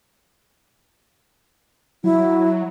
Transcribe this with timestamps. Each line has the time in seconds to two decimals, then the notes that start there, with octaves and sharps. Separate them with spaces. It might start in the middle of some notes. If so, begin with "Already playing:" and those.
2.04 F#3 E4